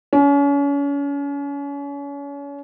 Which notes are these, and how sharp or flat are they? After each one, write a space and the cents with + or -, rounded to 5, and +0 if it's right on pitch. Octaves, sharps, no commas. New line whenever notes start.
C#4 +35